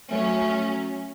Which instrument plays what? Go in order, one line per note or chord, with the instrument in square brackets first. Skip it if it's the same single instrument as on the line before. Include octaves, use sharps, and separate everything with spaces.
[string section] F#3 C#4 [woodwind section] A3